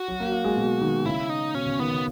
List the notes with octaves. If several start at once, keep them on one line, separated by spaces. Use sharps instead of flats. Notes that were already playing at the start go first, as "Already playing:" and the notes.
Already playing: F#4
F#3
A#3
A#3
G#3
B2
D#3
C#3 E4
D#4
B2 C#4
C#3
D#3 B3
C#3